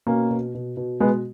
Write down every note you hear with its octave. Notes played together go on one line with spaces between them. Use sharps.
B2 A#3 C#4
B2
B2
B2
B2 G#3 B3